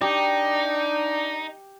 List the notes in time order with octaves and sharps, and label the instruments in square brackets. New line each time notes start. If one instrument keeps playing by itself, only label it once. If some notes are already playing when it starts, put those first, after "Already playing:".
[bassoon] D4 [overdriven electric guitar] D#4 [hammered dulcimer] G4